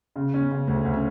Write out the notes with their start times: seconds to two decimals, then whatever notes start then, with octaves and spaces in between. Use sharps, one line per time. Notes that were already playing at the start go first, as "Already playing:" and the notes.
0.16 C#3
0.34 C#4
0.41 B3
0.51 C#3
0.67 D2 A3
0.85 D2
0.94 C#4